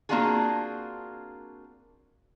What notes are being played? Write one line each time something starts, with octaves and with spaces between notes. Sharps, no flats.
A#3 C4 D4 F4 F#4 G#4